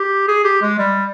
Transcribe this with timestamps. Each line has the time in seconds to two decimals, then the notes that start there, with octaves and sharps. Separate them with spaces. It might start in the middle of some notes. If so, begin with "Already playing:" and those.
Already playing: G4
0.28 G#4
0.44 G4
0.62 G#3
0.78 G3